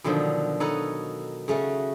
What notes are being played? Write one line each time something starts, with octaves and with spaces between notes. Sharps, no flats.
B2 D3 D#3 F3 F#3
D#4 A4 B4 C#5 D#5 F#5
C#3 A3 C#4 F#4